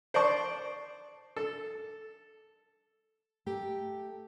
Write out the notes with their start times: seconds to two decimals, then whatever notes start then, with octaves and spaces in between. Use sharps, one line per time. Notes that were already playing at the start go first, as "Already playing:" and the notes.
0.14 C5 D5 A5 C#6
1.36 A4
3.46 A3 G4 A#4